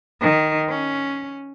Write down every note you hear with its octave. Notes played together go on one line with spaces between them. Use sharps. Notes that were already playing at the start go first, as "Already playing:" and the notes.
D#3
C#4